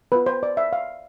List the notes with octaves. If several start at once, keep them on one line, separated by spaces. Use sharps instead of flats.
B3 F4 B4
C5
D5
E5
F5